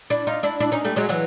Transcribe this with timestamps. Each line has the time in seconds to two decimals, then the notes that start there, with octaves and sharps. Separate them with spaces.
0.10 D4 E4
0.27 D#4 F4
0.43 D4 E4
0.60 D4 E4
0.72 C#4 D#4
0.85 G3 A3
0.96 F#3 G#3
1.09 E3 F#3